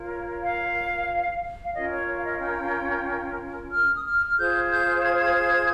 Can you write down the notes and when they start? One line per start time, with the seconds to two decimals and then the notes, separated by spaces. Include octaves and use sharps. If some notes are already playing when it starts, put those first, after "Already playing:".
Already playing: F4 A#4 C#5
0.43 F5
1.63 F5
1.74 C#4 F4 A#4 C#5 D#5
1.91 C#5
2.07 C#5
2.18 F5
2.24 D#5
2.40 G5
3.71 F6
3.96 D#6
4.05 F6
4.26 F6
4.37 F4 G#4 C5 G6
4.70 G6
5.04 G#6
5.19 G#6